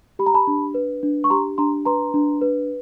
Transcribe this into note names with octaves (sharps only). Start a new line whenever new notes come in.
G4 B5
A#5
A5 B5
D4
B4
D4
C#6
G4 A#5 C6
D4 A#5 C6
B4 A#5 C6
D4
B4